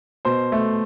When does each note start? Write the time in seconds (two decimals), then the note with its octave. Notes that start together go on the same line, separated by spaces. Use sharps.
0.25 B2 C5 C6
0.52 A3